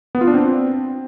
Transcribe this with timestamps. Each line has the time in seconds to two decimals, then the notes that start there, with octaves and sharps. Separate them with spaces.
0.15 B3
0.21 F4
0.28 D4
0.34 C4